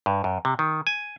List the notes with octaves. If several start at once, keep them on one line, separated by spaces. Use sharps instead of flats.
G2
F#2
C3
D#3
G#5